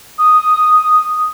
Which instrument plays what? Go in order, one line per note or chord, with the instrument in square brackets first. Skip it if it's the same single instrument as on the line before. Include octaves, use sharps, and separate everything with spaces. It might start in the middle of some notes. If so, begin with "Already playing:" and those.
[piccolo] D#6